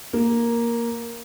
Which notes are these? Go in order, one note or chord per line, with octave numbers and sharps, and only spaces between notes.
A#3